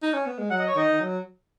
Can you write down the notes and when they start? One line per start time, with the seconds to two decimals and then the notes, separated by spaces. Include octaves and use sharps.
0.02 D#4
0.14 C#4
0.27 B3
0.39 G#3
0.50 F#3 F#5
0.59 D#5
0.67 C#5
0.75 D#3 D#4 D#5
0.92 D#3
1.01 F#3